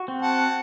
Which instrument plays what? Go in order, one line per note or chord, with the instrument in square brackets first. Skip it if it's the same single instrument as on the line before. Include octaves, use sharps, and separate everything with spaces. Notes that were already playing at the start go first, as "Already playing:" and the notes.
Already playing: [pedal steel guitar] F#4
C4
[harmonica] F#5 A5